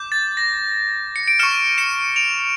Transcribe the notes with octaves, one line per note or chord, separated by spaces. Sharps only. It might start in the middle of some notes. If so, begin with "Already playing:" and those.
Already playing: D6 G6
A6
A#6
C#7
D7
C#6 F6 C#7 E7
C#7 E7
D7 F7